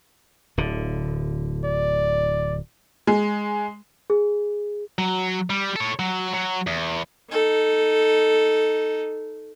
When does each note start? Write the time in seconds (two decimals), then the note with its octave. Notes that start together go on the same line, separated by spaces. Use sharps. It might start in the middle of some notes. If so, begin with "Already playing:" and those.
0.58 D1 D3
1.65 D5
3.07 G#3
4.10 G#4
4.98 F#3
5.50 G3
5.76 A4 C#5
5.99 F#3
6.34 F#3
6.67 E2
7.30 D#4 A4